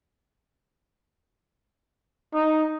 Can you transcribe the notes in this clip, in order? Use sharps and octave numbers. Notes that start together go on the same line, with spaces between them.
D#4